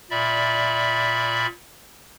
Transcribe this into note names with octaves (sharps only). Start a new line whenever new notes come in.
A#2 D5 E5 B5